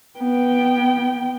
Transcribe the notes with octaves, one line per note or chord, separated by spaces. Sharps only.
B3 G5